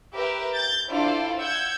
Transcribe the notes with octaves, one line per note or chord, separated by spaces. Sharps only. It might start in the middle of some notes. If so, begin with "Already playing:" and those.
G4 A#4 B4 E5
G6 A6
D4 E4 F4 G4 A4 C5
F#5 E6 G6 G#6